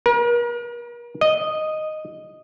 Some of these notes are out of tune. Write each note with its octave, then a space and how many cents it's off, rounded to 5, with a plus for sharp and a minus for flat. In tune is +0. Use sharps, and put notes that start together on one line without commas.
A#4 +40
D#5 -5